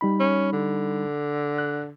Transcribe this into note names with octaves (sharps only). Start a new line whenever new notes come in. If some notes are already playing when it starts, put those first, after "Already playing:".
G3 D#4 B5
C#4
D3
F#6